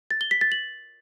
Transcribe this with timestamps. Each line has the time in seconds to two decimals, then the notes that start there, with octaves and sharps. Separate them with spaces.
0.11 A6
0.21 G7
0.31 B6
0.41 A6
0.52 F#7